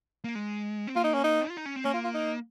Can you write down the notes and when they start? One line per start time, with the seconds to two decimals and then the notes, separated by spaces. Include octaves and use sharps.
0.24 A#3
0.35 G#3
0.87 C4
0.95 A#3 F4
1.04 D#4
1.14 C#4
1.24 D#4
1.48 F4
1.57 D#4
1.66 C#4
1.76 C4
1.84 A#3 C#4
1.94 F4
2.04 F4
2.14 D#4